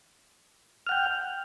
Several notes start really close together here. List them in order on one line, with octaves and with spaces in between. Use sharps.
F6 F#5 G5